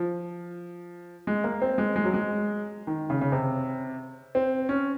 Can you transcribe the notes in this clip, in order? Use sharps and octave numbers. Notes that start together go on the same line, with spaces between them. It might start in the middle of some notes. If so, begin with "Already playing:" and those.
Already playing: F3
G#3
A#3
C4
G#3
G#3
F#3
G#3
D#3
C#3
C#3
C3
C4
C#4